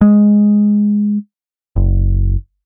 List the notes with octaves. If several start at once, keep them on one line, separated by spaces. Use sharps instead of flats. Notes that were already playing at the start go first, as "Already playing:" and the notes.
G#3
F#1